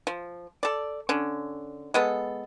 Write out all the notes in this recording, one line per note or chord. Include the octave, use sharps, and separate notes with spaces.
F3
A4 D5
D3 C#4
G#3 B3 A4